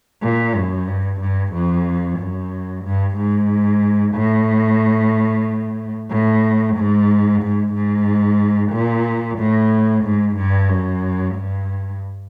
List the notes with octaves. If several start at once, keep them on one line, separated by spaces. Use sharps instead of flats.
A#2
F#2
G2
G2
F2
F#2
G2
G#2
A2
A2
G#2
G#2
G#2
A#2
A2
G#2
G2
F#2
G2